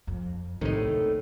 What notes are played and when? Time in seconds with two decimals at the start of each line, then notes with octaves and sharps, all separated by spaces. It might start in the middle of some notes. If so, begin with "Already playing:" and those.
0.07 F2
0.61 A#1 D#2 A2 C3 D#3 D#4